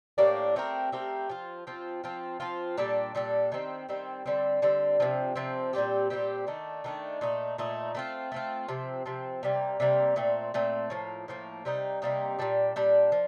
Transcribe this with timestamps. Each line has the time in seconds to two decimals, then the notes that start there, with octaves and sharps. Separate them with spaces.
0.18 A2 G3 A#3 D4
0.56 A3 C4 G4 A#4
0.92 A3 C4 G4 A#4
1.29 F3 C4 F4
1.67 F3 C4 F4
2.04 F3 C4 F4
2.40 F3 C4 F4
2.77 A#2 G3 D4 A4
3.15 A#2 G3 D4 A4
3.52 D#3 G3 C4
3.89 D#3 G3 C4
4.26 D3 G3 C4
4.62 D3 G3 C4
5.00 C3 F3 C4
5.35 C3 F3 C4
5.73 A#2 G3 C4 G4
6.10 A#2 G3 C4 G4
6.47 D#3 A3 D4
6.84 D#3 A3 D4
7.21 A#2 A3 D#4
7.58 A#2 A3 D#4
7.95 A3 C4 F4
8.32 A3 C4 F4
8.68 C3 F3 C4
9.06 C3 F3 C4
9.43 C3 G3 A#3
9.80 C3 G3 A#3
10.16 A#2 A3 C4
10.54 A#2 A3 C4
10.90 A2 F3 A#3
11.28 A2 F3 A#3
11.65 C3 G3 A#3 D#4
12.02 C3 G3 A#3 D#4
12.39 A#2 G3 D4
12.76 A#2 G3 D4
13.12 F3